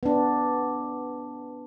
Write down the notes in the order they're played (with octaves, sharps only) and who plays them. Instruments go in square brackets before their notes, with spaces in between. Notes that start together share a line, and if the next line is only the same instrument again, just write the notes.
[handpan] B3 D4